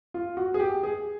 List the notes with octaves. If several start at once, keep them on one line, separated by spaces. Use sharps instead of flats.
F4
F#4
G#4
G4
G#4